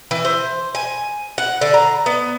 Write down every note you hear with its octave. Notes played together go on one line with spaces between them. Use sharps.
E3
C5
G#5
F#5
D3
A#5
B3